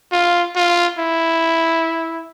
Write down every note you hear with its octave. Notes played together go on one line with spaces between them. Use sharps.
F4
F4
E4